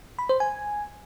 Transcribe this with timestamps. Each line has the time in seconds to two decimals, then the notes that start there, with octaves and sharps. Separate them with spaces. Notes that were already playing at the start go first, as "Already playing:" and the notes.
0.19 B5
0.29 C5
0.40 G#5